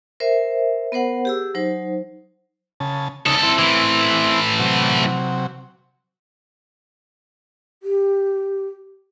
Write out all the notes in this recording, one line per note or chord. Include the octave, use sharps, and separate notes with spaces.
A#4 C5 E5
B3 A#4 C5 F#5
G4 G#4 E6
F#3 D#4 C5
C#3 A5
C2 C#3 D#4 A4
C4 E4
A2 E3
C3 F#3
G4